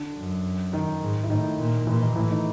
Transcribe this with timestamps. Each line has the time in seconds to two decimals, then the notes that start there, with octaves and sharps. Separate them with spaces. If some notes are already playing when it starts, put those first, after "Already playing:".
Already playing: D3 D4
0.16 F#2
0.72 D#3 D#4
1.02 G#2
1.24 E4
1.29 A2 D#3 D#4
1.59 A#2
1.87 A#2 E3 E4
2.01 D#3 D#4
2.16 A2 E3 E4
2.30 D#3 D#4